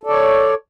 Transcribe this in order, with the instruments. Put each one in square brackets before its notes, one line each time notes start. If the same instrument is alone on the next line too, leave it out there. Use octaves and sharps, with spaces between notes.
[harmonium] A4
D5
C#5